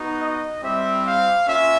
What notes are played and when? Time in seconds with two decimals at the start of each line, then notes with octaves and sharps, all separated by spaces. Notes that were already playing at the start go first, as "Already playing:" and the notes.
Already playing: B3 D#4 F#4
0.19 D#5
0.61 G3 C4 E4 G4 E5
1.04 F5
1.47 A#3 C#4 F4 E5